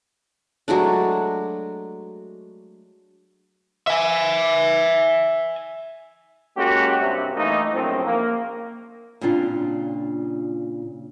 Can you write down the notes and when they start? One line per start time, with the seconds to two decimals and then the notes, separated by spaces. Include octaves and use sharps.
0.68 F#3 G#3 A3 D4
3.87 E5 G#5
6.56 G#3 A#3 C#4 F#4 G4
6.99 G2 C3
7.35 E3 A3 A#3 D#4
7.72 A#1 F#2 A2 F3 C4
8.04 A#3
9.21 A#2 C#3 C4 D4 F4